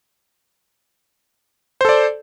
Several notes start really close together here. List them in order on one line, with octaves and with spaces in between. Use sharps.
C5 A4 D5